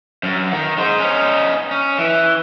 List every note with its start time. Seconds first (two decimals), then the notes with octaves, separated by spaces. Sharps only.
0.23 F#2
0.53 D#3
0.78 G#3 C5
1.00 C#4 D#4
1.71 C#4
1.99 E3